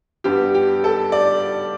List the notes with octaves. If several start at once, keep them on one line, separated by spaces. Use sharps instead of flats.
G2 G3 B3 G4
G4
A4
D5